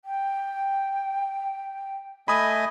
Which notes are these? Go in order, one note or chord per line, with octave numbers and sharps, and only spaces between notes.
G5
A3 D#5 G#5 B5 D#6